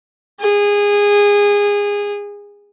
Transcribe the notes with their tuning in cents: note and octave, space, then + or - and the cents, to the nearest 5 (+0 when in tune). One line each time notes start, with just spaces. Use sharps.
G#4 -20